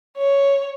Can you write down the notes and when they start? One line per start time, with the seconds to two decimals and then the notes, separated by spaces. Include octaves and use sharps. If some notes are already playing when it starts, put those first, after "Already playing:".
0.18 C#5